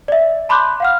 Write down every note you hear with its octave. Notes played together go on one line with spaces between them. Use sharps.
D5 E5
A5 B5 C6 D6 F#6 G6
F5 F#5 F6